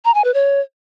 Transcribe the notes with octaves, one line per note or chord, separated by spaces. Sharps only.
A#5
G#5
B4
C#5